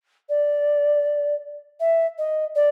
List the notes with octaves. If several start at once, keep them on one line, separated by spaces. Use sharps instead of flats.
D5
E5
D#5
D5